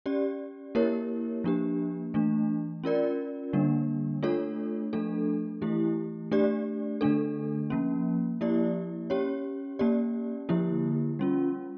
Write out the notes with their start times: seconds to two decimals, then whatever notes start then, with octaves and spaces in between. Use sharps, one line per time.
0.06 C#4 G4 D5
0.75 A#3 E4 G4 A#4 C#5
1.44 F3 A#3 D4 G4
2.14 E3 A3 D4
2.84 C#4 F4 A#4 D5
3.53 D3 G3 A#3 D4
4.23 A3 D4 F4 A4 C#5
4.93 F3 A3 D4 A4
5.62 E3 A3 E4 G4
6.31 A3 D4 G4 D5
7.01 D3 A3 D4 A4
7.70 F3 A#3 C#4
8.41 F3 A#3 E4 G4 D5
9.10 C#4 G4 C#5
9.79 A#3 C#4 G4 D5
10.49 D3 F3 A#3 E4 G4
11.19 G3 C#4 F4